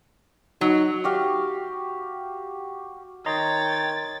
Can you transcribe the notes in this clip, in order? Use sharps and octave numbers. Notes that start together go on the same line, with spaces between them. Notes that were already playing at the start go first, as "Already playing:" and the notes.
F#3 D#4
F#4 G4 F5
D#3 C#5 D#5 G5 A#5 C6 A6